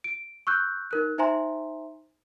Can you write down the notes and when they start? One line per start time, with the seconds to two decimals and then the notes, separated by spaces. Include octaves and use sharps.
0.04 D7
0.47 C#6 E6 F#6 G6
0.91 D#4 A#4 F#6
1.18 D#4 C5 E5 G#5 A#5 C6